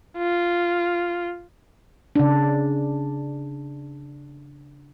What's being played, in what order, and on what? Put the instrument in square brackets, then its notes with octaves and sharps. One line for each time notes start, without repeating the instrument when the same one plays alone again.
[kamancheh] F4
[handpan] C#3 D4